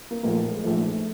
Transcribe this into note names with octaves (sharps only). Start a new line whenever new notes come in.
A#3
B1 A#2 F3 A#3
G#3
A#1 G#2 F3 A3